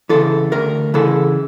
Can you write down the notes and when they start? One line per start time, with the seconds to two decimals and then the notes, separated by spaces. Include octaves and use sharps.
0.09 C#3 E3 A4
0.52 D2 A#4
0.94 C#3 E3 A4